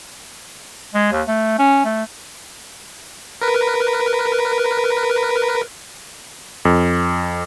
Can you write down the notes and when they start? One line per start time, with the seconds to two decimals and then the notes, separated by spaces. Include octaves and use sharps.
0.94 G#3
1.12 D#2
1.28 A3
1.59 C#4
1.85 A3
3.42 A#4 B4
6.65 F2